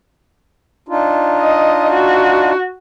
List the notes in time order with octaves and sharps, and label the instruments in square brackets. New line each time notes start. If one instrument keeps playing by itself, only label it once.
[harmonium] D4 D#4 F4
[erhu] D#5
F#4